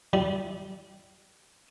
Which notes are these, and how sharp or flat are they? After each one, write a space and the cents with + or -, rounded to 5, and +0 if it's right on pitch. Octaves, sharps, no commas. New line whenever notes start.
G3 -20